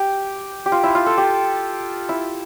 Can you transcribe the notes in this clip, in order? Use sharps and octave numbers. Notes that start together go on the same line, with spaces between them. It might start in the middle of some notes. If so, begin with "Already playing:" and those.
Already playing: G4
G4
F4
E4
F4
A4
G4
E4